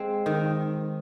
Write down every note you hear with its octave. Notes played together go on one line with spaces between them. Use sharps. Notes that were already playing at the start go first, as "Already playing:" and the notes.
Already playing: G#3 C4
D#3